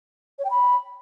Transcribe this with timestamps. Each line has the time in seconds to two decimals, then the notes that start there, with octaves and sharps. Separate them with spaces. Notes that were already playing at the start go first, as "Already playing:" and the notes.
0.39 C#5
0.44 G5
0.50 B5